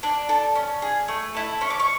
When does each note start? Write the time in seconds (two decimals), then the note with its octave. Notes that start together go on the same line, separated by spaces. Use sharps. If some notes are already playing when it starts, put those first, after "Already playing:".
0.03 D4 D5
0.29 A4
0.55 C#4
0.82 G#4
1.08 A3
1.35 E4 A4
1.61 C#4 C#6
1.70 D6
1.79 C#6